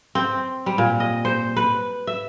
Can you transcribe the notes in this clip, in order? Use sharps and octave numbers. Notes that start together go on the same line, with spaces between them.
C4
G3
A#2
D#5
C5
B4
E5